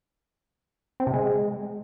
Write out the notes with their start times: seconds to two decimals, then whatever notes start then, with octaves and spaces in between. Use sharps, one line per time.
1.00 C4
1.07 C3
1.14 G#3